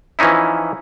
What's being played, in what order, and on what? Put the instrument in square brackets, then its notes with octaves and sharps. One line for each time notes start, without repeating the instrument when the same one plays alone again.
[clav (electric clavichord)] E3 F3 C#4 D#4 E4